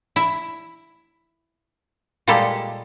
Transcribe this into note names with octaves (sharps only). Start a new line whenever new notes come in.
E4
A#2 G3 G#3 A#3 G4 A4